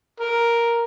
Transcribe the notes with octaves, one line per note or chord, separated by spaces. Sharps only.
A#4